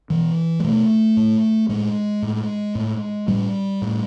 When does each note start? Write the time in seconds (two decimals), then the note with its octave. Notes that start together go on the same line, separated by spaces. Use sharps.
0.10 B2 E3
0.60 G#3
0.64 B2 A3
1.17 A2
1.69 A2 G#3
2.22 A2
2.75 A2
3.28 A2 G3
3.82 A2